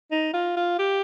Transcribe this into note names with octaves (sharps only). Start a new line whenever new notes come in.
D#4
F4
F4
G4